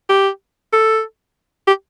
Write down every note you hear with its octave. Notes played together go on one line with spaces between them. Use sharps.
G4
A4
G4